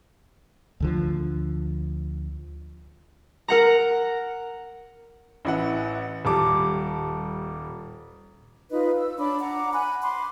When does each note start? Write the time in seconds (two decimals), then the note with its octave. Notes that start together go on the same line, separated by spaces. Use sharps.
0.80 D2 D3 F3
3.48 A#4 F#5 A#5
5.45 A1 E4 F#5
6.25 D#1 G3 A5 D6
8.71 D#4 F4 B4 D#5
8.96 E6
9.18 D4 C#5 B5 D6
9.39 F#5 A#5 D6
9.73 G#5 B5 F#6
10.02 B5 C6 D6